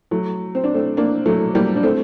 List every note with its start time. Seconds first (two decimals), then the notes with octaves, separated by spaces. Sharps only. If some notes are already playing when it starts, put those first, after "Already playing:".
0.11 F#3 A3
0.55 C4
0.64 D4
0.74 A3 C4
0.97 A#3 D4
1.26 F#3 A3
1.55 G3 A#3
1.76 D4
1.83 A3 C4